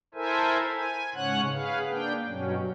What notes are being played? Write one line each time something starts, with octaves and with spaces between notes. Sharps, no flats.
E4 A4 A#4 C5 E5 G#5
G#5
G#2 C#3 C#4 C#5 F#5 F#6
G#4 B4 F5
A#3 D4 G5
G2 B2 F#3 C#4